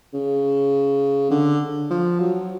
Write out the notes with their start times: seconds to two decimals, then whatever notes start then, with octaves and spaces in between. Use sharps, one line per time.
0.14 C#3
1.31 D3
1.91 F3
2.20 F#3